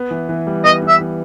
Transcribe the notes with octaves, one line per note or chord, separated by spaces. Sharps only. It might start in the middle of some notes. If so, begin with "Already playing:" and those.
Already playing: B3
E3
E3
G3
B3 D#5
E3
E5
E3